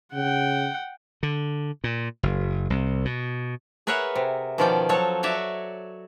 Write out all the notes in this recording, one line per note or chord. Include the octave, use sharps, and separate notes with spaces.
C#3 F#5 G5
D3
A#2
F#1
C2
B2
G#4 A#4 B4 C#5 E5 F#5
C3
B2 D#3 F3 C#4 D5 G5
F3 F#3 A4 C#5
F#4 C#5 D5 E5